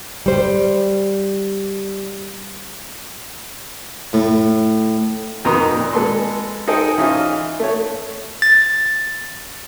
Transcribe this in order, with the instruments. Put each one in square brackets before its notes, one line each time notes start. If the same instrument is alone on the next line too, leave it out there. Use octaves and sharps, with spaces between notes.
[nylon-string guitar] G3 C5
[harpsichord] A2
[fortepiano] F2 D#3 B4 A#5 C6 D#6
A#2
G#3 A4 B4 C6
D#4 G#4 A4 C5 D#5 G5
E3 C#4 D#4 F4
A3 C#5
[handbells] A6